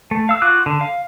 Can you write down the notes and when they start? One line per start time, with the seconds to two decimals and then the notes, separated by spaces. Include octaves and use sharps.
0.11 A3
0.29 F5 E6
0.42 F4 F#4 D6 F#6
0.66 D3
0.81 F5